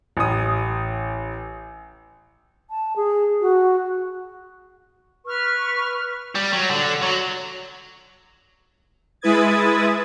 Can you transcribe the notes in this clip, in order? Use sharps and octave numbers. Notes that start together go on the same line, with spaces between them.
A1 D#6
A5
G#4
F#4
B4 C#6 F6
G3
F#3
D3
F#3
G#3 E4 B4 D#6 G#6 A6